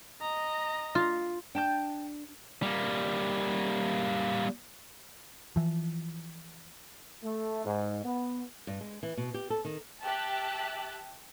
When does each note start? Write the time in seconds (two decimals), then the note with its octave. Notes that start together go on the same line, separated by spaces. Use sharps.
0.21 D#5 A#5
0.95 F4
1.55 D4 G5 A5 G6
2.62 G3 A#3
5.56 E3 F3
7.23 A3
7.65 G#2
8.04 B3
8.67 G2
8.81 G#3
9.03 E3
9.17 B2
9.34 G4
9.50 A4
9.65 D#3
10.03 G4 E5 A5 F#6